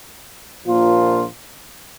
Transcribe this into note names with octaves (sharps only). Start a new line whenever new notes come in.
A#1 A#2 F3 A#3 F4